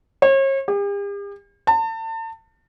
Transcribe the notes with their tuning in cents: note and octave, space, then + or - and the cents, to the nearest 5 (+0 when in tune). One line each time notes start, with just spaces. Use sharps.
C#5 -40
G4 +45
A5 +35